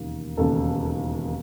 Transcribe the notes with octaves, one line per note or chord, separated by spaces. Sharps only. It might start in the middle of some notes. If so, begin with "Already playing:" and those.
Already playing: E1 D#2 C#3
E1 D#2 C#3 A4